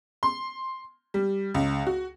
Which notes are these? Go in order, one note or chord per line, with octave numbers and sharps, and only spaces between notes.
C6
G3
C#2
F#4